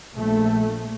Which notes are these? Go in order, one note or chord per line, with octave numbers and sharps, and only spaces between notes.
A#1 A3